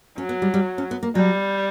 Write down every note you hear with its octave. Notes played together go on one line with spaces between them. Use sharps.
F#3 C#4
B3
G3
G3
C#4
B3
A#3
F#3 G3